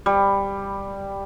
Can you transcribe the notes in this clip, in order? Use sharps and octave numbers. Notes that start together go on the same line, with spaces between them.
G3